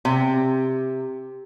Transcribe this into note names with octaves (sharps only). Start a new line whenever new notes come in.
C3